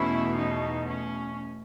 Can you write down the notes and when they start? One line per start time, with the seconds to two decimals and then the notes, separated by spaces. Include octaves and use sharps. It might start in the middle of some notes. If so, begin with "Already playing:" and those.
Already playing: E2 B2 A3 C#4 E4
0.37 D#4
0.86 C#4